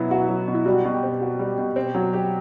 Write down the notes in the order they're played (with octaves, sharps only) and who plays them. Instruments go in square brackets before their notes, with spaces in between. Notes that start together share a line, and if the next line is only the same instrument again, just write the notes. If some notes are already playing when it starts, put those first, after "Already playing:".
Already playing: [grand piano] B2 F#3 B3 [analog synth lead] E4
[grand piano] F#4
F#3
B2
[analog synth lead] E4
[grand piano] G3 [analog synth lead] F#4
[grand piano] B2
[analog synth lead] G4
[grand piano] C4
F#4
G3
B2
C4
F#3
G4